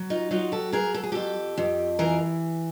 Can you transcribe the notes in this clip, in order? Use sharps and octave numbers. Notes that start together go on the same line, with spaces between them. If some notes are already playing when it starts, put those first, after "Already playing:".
Already playing: F#3
D#4 F4
F#3 D#4 F4
G4 A4
F#3 G#4 A#4
A4
G#4
F2 G4 A4
F2
E3 G#4 A#4